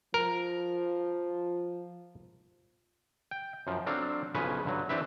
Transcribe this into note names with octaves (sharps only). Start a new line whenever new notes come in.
F3 A#4
G5
F#2 F3
F#3 C4 D4 A4 F5
B1 C#3 F3 B4 C#5 G#5
G2 D3 F#3
E3 C4 D4 G4 B4 E5